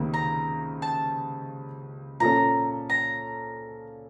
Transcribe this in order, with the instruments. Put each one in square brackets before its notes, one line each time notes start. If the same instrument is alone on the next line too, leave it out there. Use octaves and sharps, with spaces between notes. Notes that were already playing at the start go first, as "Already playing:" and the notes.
Already playing: [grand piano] C#2 C3 D#3 A#3
[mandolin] A#5
A5
[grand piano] A#2 F3 A#3 C#4 A4 [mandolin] A#5
[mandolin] A#5